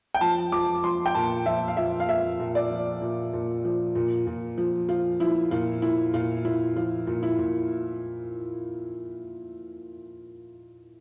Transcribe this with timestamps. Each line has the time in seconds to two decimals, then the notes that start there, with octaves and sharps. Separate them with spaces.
0.14 G5
0.21 F3 A5
0.52 F3 D6
0.83 F3 C6
1.06 G5
1.15 A#2 A5
1.46 F3 E5
1.68 F5
1.77 F3 E5
2.00 F5
2.08 F3 E5
2.40 A#2
2.55 D5
2.71 F3
3.02 A#2
3.33 A#2
3.65 F3
3.95 A#2
4.27 A#2
4.58 F3
4.89 F3 F4
5.20 F3 E4
5.51 A#2 F4
5.82 A#2 E4
6.13 A#2 F4
6.45 A#2 E4
6.76 F3 F4
7.07 A#2
7.23 E4
7.39 A#2